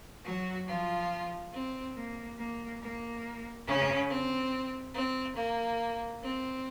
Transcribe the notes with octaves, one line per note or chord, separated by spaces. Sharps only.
F#3 F#4
F3 F4
C4
A#3
A#3
A#3
C#3 C#4
C4
C4
A#3
C4